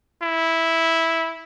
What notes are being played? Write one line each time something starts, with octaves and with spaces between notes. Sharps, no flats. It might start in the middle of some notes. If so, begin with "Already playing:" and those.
E4